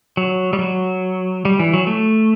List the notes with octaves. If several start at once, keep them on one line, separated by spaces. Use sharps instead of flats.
F#3
G3
F#3
G3
E3
F#3
A3